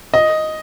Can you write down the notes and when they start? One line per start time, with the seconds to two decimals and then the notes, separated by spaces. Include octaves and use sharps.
0.14 D#5